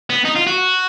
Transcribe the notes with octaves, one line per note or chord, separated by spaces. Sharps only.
B3
D#4
F4
F#4